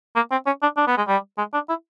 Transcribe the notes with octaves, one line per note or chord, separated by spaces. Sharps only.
A#3
C4
C#4
D4
D4
B3
G#3
G3
G#3
D4
E4